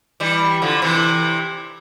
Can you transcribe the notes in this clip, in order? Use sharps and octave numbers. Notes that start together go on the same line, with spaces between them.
E3 G3
D3 F3
C3 E3